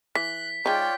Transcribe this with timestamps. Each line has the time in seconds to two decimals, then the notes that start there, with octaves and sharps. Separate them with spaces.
0.15 E3 F#6 B6
0.66 G#3 D#4 F4 C#5 D5 G5